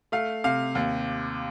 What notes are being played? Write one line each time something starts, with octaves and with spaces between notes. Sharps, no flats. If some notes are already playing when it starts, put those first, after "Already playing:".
A3 F5
C3 F5
D#2